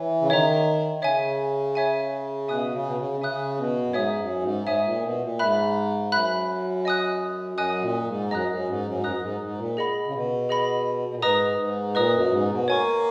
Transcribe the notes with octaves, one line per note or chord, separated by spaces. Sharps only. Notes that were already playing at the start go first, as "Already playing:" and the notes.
Already playing: E3 C#5 E5
C#3
D#3 C#5 E5 A#5
D#3
C#3 C#5 E5 G#5
C#5 E5 G#5
B2 E5 G#5 D#6 F#6
C#3
B2
C#3
C#3 E5 G#5 D#6 F#6
B2
F#2
G#2 C#5 E5 G#5 D#6
F#2
G#2
G#2 C#5 E5 G#5 D#6
A#2
B2
A#2
G#2 E5 B5 F#6
F#2 E5 B5 F#6
D#5 G#5 D#6 F#6
F#2 D#5 G#5 D#6 F#6
A#2
G#2
F#2 A#4 D#5 A#5 D#6 F#6
F#2
G#2
F#2
G#2
F#2 A#4 D#5 A#5 D#6 F#6
F#2
G#2
G#2
A#2
G#4 D#5 F#5 B5
C#3
B2
G#4 D#5 F#5 B5
B2
A#2
G#2 B4 D#5 A#5 D#6
G#2
A#2 B4 D#5 A#5 D#6
F#2
G#2
B2
A#3 C#5 G#5 C#6